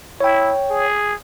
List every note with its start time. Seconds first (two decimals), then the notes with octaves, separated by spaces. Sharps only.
0.20 E4 C#5 G5
0.70 G#4